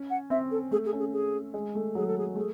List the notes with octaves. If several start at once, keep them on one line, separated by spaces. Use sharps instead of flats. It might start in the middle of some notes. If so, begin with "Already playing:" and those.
Already playing: C#4
F#5
C4 E5
A4
A3 G#4
G#4
C#4
G#4
G#4
G#3
A3
F#3 G#4
A4
G#4
A3 G#4